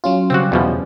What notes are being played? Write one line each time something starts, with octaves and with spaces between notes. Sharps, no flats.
F#3 C#4 F4
C#3 G3 C4 F#4
E2 B2 F3